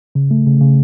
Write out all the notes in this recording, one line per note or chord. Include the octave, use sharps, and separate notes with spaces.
C#3
A3
C#3
C#3